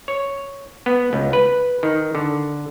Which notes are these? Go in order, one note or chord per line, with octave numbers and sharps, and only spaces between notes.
C#5
B3
C#2
B4
D#3
D3